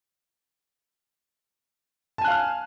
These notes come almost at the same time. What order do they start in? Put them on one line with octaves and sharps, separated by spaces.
A5 G#5 F#6 F5 F6